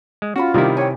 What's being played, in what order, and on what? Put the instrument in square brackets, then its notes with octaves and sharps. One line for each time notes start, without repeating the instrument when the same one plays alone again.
[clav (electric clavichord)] G#3
[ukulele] C#4 D5 B5 [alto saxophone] F4 [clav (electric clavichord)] F#4
[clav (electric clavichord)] C3 E4 [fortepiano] D#3 G3
[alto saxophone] C#5 [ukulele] G5 G#5